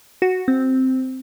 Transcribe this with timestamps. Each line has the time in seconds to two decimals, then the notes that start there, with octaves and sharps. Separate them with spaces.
0.22 F#4
0.48 C4